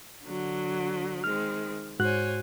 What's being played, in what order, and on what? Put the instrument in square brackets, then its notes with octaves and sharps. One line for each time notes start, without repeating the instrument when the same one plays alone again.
[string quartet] D3 F#3
[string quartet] D#3 G#3 C4 [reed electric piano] F6
[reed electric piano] G#2 F#4 F#6 [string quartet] C5 C#5 G#5